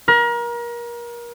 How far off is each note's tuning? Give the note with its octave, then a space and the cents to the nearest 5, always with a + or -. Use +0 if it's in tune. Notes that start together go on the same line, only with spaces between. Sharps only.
A#4 +30